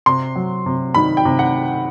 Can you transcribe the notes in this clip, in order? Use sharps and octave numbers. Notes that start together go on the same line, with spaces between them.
C3 C6
F#3
C3
D#3 B5
G5
C3
F#5